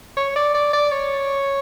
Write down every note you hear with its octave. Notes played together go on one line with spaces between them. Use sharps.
C#5
D5
D5
D5
C#5